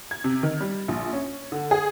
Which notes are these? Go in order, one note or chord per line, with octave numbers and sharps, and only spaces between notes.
G#6
C3
D#3
G3
A#1
C#4
D3
G#4